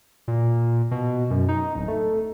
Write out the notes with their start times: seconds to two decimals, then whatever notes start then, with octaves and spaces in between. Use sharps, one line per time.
0.28 A#2
0.91 B2
1.30 F#2
1.49 D#4
1.75 D1
1.88 A3